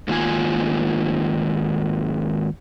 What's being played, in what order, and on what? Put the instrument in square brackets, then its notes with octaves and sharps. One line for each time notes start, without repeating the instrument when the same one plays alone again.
[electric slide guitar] G#2 D#3 A#3 F4 G#5